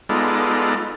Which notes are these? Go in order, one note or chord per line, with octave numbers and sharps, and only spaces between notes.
G#3 B3 D#4 F4 A4 D5